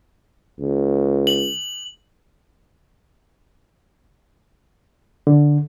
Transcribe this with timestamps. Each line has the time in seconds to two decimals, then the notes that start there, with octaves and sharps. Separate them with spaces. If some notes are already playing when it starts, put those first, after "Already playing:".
0.59 C#2
1.27 F#7
5.27 D3